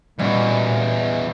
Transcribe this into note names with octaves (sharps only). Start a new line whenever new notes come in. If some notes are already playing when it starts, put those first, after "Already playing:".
E2 A#2 E3 G3 C#4 F#4 D#5